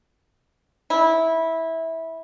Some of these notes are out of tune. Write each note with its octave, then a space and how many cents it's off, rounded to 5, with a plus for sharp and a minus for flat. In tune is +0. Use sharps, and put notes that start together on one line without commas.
E4 -15